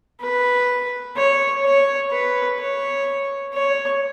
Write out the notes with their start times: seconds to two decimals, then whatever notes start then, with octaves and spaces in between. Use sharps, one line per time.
0.21 B4
1.16 C#5
1.63 C#5
2.11 B4
2.59 C#5
3.54 C#5